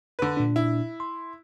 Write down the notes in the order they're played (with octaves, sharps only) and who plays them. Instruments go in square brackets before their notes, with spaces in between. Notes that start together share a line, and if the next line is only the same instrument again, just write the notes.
[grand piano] D3 B4
[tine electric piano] A#2 D4
[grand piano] E4
[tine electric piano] C6